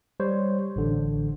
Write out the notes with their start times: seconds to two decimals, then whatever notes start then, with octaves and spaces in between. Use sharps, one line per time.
0.20 G3 C5 C#5
0.76 A1 D3